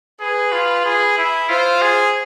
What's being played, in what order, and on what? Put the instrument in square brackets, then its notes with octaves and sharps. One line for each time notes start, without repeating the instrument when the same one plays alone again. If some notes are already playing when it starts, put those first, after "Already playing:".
[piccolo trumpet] G#4 [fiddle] B4
[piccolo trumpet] F4
G#4
E4
[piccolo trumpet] F4 [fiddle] C5
[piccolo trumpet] G#4